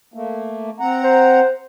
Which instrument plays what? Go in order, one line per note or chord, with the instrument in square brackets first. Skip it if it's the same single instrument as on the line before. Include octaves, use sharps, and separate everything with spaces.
[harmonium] A3 A#3
C4 F#5 A#5
[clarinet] C5